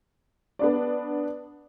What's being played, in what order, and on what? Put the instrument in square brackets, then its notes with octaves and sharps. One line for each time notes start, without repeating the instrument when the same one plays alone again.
[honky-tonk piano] B3 D4 D5